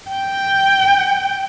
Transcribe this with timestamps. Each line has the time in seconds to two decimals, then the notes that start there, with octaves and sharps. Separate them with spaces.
0.11 G5